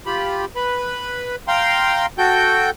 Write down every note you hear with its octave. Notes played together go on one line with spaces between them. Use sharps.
F4 G4 B5
B4 B5
F5 G5 A#5 C6
F#4 A4 G5 G6